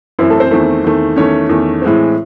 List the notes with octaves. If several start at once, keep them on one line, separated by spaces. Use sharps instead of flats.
F#2 E3 C4 E4
A3 A4
C4 C5
E2 D#3 A3
E2 D#3 A3
E2 D#3 A3 C#4 C#5
E2 D#3 A3
A2 E3 G#3 C4